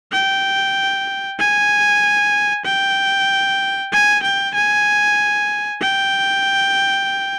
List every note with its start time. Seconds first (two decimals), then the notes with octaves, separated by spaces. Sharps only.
0.12 G5
1.39 G#5
2.65 G5
3.93 G#5
4.23 G5
4.55 G#5
5.82 G5